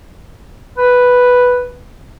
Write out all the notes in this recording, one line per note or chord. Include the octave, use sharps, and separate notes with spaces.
B4